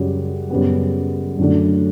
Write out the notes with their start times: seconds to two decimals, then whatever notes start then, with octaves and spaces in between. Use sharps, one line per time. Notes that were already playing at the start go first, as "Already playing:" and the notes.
Already playing: F#2 C#3 G3 F#4
0.50 F#2 C#3 G3 B3
1.38 F#2 D3 F#3 A3 D4